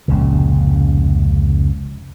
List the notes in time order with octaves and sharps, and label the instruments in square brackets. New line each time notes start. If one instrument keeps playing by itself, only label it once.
[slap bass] F1 C#2 A#2 C#3